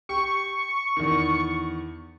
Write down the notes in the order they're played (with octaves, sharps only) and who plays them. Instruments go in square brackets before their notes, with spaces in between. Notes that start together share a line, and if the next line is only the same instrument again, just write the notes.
[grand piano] G4 [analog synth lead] C#6
[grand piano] E2 D#3